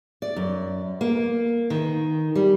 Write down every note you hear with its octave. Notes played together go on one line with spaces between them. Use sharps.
D5
F#2
A#3
D#3
G3